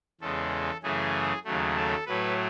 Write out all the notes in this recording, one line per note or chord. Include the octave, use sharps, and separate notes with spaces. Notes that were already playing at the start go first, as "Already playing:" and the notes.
E2 C#3 G#3 A4
F#2 C#3 E3 A3 G#4
D#2 C#3 F#3 A3
A4
A2 F#3 A3 B4